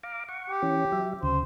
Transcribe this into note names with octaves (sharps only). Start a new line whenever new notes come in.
F5 A#5 D6
F#5 C#6
G4
E3 C#4
F#3 E5
D2 C#3 C5